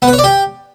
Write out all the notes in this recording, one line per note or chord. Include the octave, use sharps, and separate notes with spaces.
B3
B4
C#5
D5
G4